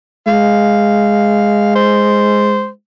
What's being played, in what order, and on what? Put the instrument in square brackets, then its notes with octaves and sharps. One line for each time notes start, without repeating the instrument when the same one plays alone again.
[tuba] G#3 [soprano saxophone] F5
[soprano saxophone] C5